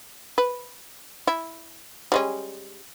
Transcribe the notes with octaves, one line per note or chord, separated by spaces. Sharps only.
B4
E4
G3 G#3 C#4